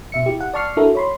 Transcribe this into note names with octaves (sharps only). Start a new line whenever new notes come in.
B2 E5 C#7
E4 G4
F#5
D5 A5 C#6 F6 C7
D4 E4 F#4 A4 A#4
C#5 B5 C6